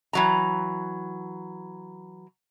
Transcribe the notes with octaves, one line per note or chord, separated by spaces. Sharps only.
E3 F#3 A#5